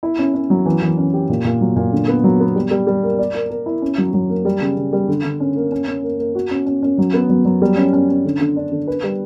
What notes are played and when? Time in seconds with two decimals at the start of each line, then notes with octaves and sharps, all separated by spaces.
0.03 E4
0.19 C#4
0.34 C#4
0.50 F#3
0.66 E3
0.82 E3
0.98 C#4
1.14 G4
1.29 A#2
1.45 A#2
1.61 F#3
1.76 A#2
1.92 D3
2.08 B3
2.24 F#3
2.40 B3
2.55 G3
2.71 G3
2.87 G3
3.03 A#3
3.18 D5
3.35 A#4
3.50 A#4
3.66 E4
3.82 C#4
3.98 F#3
4.13 F#3
4.29 A#3
4.45 G3
4.61 C#3
4.77 C#3
4.93 G3
5.08 D3
5.24 D3
5.40 C#4
5.56 A#3
5.72 C#4
5.87 C#4
6.03 A#3
6.19 A#3
6.35 F#4
6.51 C#4
6.66 C#4
6.83 C#4
6.98 F#3
7.14 B3
7.30 F#3
7.45 F#3
7.62 G3
7.77 C#4
7.93 C#4
8.09 C#4
8.25 D3
8.41 D3
8.56 D4
8.72 D3
8.88 B4
9.04 G3